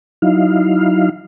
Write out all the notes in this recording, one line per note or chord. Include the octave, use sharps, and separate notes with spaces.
F#3 D#4 E4 F5